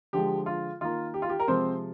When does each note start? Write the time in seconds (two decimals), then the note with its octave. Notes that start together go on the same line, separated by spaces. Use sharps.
0.13 D3 F3 G#3 G4
0.46 F4
0.81 D#3 A#3 F4
1.14 G4
1.22 F4
1.29 G4
1.40 A#4
1.48 C3 F3 G#3 C4 C5